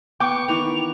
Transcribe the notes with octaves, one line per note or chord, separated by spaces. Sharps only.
B3 G5 C#6 D6
D#3 E3 B3 F7